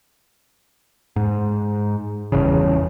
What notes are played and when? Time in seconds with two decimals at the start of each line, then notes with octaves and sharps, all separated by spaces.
1.16 G#2
2.32 G1 E2 C#3